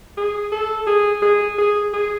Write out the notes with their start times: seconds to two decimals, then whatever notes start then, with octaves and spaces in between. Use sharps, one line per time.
0.17 G#4
0.52 A4
0.87 G#4
1.22 G#4
1.58 G#4
1.93 G#4